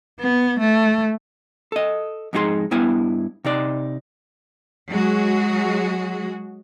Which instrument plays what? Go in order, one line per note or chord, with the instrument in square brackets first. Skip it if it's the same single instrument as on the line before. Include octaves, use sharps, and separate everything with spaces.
[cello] B3
A3
[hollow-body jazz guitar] A4 D#5
F2 G#2 D#4 F#4 G#4 C6
G2 B3 E4 G#5
C3 D#4 D5
[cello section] F#3 G#3 F#4 G#4